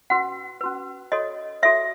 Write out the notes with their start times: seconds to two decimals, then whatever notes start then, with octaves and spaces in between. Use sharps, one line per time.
0.10 C#4 F#4 B4 F#5
0.61 C#4 F#4 B4
1.12 F#4 A4 C#5 D#5
1.62 F#4 A4 C#5 E5